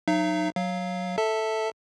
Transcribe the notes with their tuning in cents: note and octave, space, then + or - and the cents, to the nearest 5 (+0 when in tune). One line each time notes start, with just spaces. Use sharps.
F#3 -20 D#4 -15 E5 +45
F#3 +0 F5 +0
A4 +0 E5 -10 A5 +10